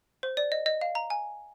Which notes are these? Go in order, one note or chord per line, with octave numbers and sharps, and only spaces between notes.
C5
D5
D#5
D#5
F5
A#5
G#5